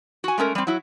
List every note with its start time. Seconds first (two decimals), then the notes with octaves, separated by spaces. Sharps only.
0.24 F#4 G#5
0.38 G#3 A3 C#4 A#4
0.55 G3 C4
0.67 F#3 E4